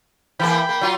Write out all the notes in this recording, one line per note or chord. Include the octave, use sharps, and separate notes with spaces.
E3 A#3 G5 B5
A#3
F#3 F4